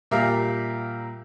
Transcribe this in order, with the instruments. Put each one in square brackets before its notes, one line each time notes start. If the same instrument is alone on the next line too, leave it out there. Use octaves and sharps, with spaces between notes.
[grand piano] A#2 G3 G4 A#4 E5 F5